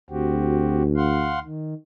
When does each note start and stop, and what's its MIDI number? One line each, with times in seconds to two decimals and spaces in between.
0.11 1.46 38
0.11 0.83 60
0.11 0.83 66
0.11 0.83 67
0.96 1.39 77
0.96 1.39 78
0.96 1.39 84
1.43 1.74 51